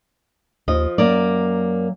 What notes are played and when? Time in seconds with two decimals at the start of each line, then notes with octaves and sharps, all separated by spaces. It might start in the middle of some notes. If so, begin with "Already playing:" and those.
0.68 D#2 F3 D#5
0.98 F#2 F#3 A#3 D5